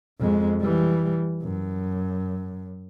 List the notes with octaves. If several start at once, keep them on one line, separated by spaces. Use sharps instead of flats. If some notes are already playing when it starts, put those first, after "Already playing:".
F2 G#3
E3 G3
F#2